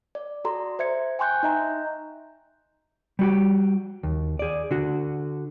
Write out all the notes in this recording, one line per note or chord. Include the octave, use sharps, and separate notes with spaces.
D5
F#4 A4 D5 A#5 C6
C5 E5 G#6 C#7
G5 G#5 C6 C#6 F#6 G6
D#4 D#5 E5 A#5 G6
G3 F#4 G4
D#2
G#4 D5
D3 F#4